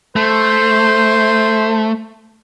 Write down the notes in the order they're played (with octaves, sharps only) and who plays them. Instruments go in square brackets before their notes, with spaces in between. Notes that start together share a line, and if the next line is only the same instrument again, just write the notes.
[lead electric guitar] A3 [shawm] C5